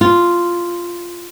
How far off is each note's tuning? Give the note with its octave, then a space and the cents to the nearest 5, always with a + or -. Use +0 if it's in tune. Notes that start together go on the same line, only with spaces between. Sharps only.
F4 -5